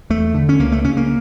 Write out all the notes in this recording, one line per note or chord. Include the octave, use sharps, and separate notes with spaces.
E2 A3
D3
C#4
C#2 A#3
A3
C#3 C#4
A#3